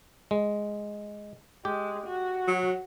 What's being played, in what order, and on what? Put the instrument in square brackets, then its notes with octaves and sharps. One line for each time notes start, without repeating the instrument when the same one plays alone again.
[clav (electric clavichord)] G#3
[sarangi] G#3 [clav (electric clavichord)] G4
[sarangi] F#4
[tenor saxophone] F#3